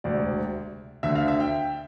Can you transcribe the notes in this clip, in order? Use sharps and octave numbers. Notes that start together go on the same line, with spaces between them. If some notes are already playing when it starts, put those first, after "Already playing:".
E1 D2 C3 D5
D2 D3 E5
F5
E5
G5